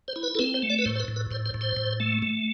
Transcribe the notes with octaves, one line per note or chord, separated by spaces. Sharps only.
C5
E4
B4
A4
C4 B4
C5
A3
D5
B4
A2 C5
C5
B4
A2
B4
A2 C5
C5
A2
C5
A2
A3
A3